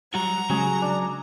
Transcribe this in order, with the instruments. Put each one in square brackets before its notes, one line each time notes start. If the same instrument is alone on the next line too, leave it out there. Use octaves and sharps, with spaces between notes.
[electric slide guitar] F#3 G3 F#4 [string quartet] A#5
[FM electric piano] C#3 G#3 G#5 [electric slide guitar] F#3 [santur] C#4 G#4
[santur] D4